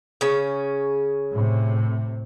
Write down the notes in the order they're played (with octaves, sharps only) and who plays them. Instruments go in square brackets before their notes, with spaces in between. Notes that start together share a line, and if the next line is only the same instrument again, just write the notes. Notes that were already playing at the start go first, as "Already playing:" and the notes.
[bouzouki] C#3 C#4
[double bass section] A2 C3